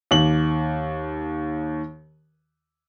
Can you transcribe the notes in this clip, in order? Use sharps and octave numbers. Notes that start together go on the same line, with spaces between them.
D#2 F#7